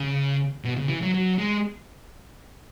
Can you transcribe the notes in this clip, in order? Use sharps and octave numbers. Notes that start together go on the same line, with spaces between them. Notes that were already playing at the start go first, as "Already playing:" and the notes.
Already playing: C#3
B2
C#3
E3
F#3
F#3
G#3